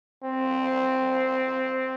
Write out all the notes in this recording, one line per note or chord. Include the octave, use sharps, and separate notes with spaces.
C4